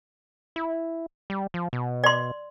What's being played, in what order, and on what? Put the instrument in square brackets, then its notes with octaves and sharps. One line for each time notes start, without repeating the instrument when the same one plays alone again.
[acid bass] E4
G3
F3
B2
[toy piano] D5 C6